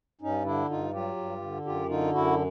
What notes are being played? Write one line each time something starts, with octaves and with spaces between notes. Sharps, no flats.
G2 C#4 D#4
D3 D4 E4
G2 D#4 F4
F#3 F4 G4
G2
D3
F#2 F4 G4
D3 D#4 F4
F#2 E4 F#4